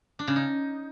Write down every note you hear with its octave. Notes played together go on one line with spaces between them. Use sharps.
D4
C#3
D#4